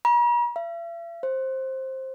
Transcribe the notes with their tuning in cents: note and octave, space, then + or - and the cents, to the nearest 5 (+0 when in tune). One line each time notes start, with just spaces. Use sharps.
A#5 +45
E5 +45
C5 +10